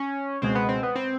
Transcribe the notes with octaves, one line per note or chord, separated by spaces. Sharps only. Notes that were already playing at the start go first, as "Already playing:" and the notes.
Already playing: C#4
C#2 B2 G#3 C4
B3
C4
B3
C4